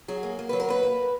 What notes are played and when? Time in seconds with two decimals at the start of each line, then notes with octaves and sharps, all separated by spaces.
0.08 F#3 G#4
0.23 A#3
0.39 A#3
0.49 F#3 B4
0.60 A#4
0.69 A#3 B4
0.83 A#3